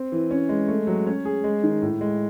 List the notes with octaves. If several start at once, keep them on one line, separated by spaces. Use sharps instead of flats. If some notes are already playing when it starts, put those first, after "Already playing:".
Already playing: C4
E3
C#4
G#3
A3
F#3
C#4
G#4
G#3
D#3
A2
G#3